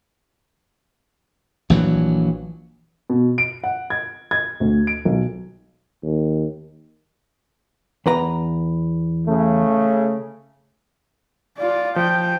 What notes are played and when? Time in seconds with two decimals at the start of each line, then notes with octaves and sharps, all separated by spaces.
1.70 A#1 E3 F#3
3.10 B2
3.38 D7
3.64 F#5
3.90 G#6
4.31 G#6
4.60 D2
4.87 D7
5.05 B1
6.03 D#2
8.06 E2 B4 A#5
9.27 C#3 A3
11.58 F4 D5
11.96 F3 G5